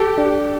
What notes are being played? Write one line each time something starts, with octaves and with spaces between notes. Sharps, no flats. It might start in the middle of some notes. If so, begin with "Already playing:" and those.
Already playing: G4 A4
D4